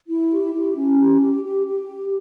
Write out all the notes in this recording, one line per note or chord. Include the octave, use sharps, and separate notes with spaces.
E4
G4
E4
C#4
G4
G4
G4
G4